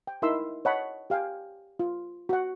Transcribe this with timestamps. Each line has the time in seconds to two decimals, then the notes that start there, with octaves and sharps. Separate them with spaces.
0.07 G5
0.22 D#4 E4 A#4 E5 C6 E6
0.65 C#5 D#5 F#5 A5 B5
1.10 G4 F5 G5 G#5
1.80 F4
2.29 F#4 F#5